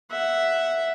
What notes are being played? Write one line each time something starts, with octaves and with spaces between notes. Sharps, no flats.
E5 F#5